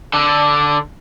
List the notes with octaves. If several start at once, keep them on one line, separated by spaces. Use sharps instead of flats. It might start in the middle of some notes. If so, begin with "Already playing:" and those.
D3 A4